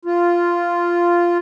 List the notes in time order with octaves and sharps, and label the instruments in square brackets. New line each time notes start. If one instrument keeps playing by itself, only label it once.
[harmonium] F4